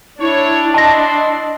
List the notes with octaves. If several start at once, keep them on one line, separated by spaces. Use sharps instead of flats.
D4 E4 C#5
E4 D#5 E5 A5 C6 A#6